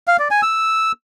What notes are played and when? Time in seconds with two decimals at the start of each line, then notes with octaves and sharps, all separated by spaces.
0.07 F5
0.19 D5
0.31 G#5
0.42 E6